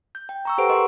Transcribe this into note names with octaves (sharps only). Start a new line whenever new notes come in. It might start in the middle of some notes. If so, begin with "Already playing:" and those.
G6
G5
A#5 C#6 E6
G4 A4 B4 C5 F#5 D7
A#4 C5 D#5 C6 C#6